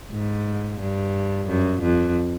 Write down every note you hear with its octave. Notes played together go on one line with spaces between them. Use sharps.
G#2
G2
F#2
F2